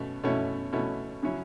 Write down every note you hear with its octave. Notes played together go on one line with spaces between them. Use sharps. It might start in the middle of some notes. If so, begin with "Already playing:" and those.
Already playing: B2 A3 C#4
B2 A3 C#4 E4
B2 A3 C#4 E4
C#3 F#3 C#4 E4